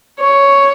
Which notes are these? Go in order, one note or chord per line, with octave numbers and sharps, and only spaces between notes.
C#5